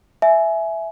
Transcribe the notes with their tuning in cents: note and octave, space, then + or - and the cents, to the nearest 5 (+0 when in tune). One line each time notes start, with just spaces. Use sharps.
E5 +0 G#5 +20